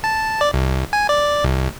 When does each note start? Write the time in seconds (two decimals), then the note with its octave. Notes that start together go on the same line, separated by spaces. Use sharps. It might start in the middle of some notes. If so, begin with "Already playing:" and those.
0.04 A5
0.41 D5
0.54 C2
0.93 G#5
1.09 D5
1.44 C2